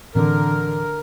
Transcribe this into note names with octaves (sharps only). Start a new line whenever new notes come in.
A2 D3 E3 C4 A#4